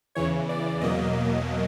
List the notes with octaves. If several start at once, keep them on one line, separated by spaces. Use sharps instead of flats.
E2 C#3 E3 C#5
D5
E2 B2 F#3 A#3 D#5